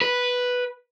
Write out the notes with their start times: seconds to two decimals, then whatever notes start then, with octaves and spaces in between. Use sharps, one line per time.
0.02 B4